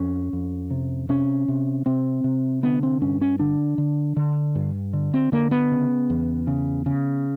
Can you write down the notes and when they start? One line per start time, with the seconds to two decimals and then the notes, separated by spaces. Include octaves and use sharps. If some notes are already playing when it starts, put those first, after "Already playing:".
Already playing: F2 C#4
0.33 F2
0.70 C3
1.09 C3 C#4
1.48 C3
1.86 C3 C4
2.24 C3
2.63 D3 B3
2.83 C4
3.02 G2 C#4
3.21 C#4
3.39 D3 D4
3.78 D3
4.17 D3
4.55 G2
4.93 D3
5.14 C4
5.32 D3 A#3
5.51 B3
5.71 C#3
6.10 E2
6.47 C#3
6.86 C#3